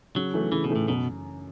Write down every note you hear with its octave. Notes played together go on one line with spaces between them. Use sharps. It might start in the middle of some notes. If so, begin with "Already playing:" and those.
C#3 F#3
E3 A3
C#3 E3
B2
E3 A3
A2
F#2 B2